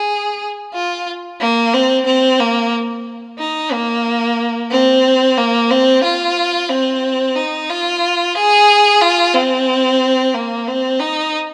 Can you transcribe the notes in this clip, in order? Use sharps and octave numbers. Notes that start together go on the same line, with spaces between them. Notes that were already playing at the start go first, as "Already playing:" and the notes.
Already playing: G#4
F4
A#3
C4
C4
A#3
D#4
A#3
C4
A#3
C4
F4
C4
D#4
F4
G#4
F4
C4
A#3
C4
D#4